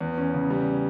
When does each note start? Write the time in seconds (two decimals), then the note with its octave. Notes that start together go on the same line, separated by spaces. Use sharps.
0.01 E2
0.18 C#4
0.34 C#3
0.50 G3